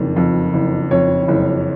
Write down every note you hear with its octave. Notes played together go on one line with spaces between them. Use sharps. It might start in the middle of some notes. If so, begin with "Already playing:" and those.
Already playing: F#1 F2 D#3
F2
F#1
F2 C#5
F#1